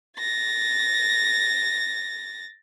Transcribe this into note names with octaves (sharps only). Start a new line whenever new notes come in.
A6 A#6